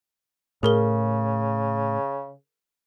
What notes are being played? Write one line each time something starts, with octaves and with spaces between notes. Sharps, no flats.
A2 C#3 G#4 A#4 G7